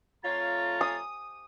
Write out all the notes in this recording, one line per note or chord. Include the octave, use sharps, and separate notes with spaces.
F2 A3 F4 C#5 A#5 A6
D#6